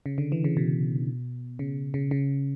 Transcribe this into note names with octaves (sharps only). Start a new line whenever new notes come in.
C#3
D3
E3
C#3
B2
C#3
C#3
C#3